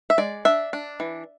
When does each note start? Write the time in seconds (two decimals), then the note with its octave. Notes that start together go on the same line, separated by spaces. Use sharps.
0.10 E5
0.18 G#3 D5
0.45 D4 E5
0.73 D4
1.00 E3